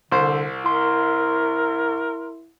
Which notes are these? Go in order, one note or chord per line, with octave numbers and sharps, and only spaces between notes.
C2 D3 C5
E4 A#4 C6